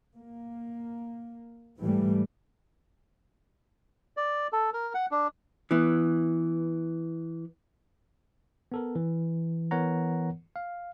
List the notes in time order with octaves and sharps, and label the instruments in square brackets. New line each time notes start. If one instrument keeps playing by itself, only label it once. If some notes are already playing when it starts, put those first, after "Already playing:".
[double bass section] A#3
G#2 E3 G3 A3
[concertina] D5
A4
A#4
F#5
D4
[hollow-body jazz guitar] E3 B3
[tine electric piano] B3 A4 A#4
E3
E3 B3 A#4 C#5 F#5 A#5
F5